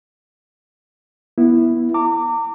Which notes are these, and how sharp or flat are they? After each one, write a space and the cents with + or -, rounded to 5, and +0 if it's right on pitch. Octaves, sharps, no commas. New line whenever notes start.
B3 -15 E4 +0
A#5 -35 D6 +0